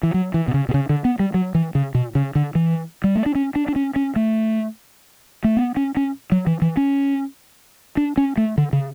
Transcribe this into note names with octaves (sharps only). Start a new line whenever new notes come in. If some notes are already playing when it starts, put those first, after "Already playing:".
E3
F#3
E3
B2
C#3
B2
C#3
D3
B3
G3
F#3
E3
C#3
B2
C#3
D3
E3
G3
A3
D4
C#4
D4
D4
C#4
C#4
A3
A3
B3
C#4
C#4
F#3
E3
E3
C#4
D4
C#4
A3
D3
C#3